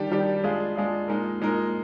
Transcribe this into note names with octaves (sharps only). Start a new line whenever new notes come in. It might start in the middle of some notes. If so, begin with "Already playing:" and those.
Already playing: D#3 G3 D4 G4
D#3 G3 D4 G4
G#3 D4 F4 G#4
G#3 D4 F4 G#4
A#2 G#3 D#4 A#4
A#2 G#3 D#4 A#4